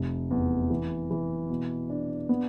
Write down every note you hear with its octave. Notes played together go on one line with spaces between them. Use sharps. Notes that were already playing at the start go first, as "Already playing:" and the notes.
Already playing: F1
E2
E3
E3
B2
D4
B3